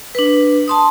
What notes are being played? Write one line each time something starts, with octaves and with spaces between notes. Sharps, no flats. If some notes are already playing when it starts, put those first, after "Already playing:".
D4 B4
A5 C6 D#6